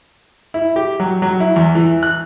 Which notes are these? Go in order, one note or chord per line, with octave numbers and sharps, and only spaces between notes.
E4
G4
F#3
F#3
E4
E2
E3
F#6